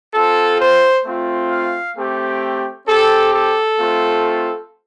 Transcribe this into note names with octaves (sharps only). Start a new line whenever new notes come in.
C4 F4 A4
C5
A3 C4 F4
F5
A3 C4 G4
C4 G4 A4
A4
A3 C4 F4